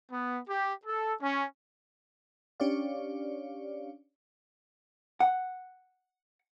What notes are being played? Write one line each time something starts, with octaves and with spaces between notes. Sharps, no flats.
B3
G4
A4
C#4
C#4 D4 G4 C#5 D5 F5
F#5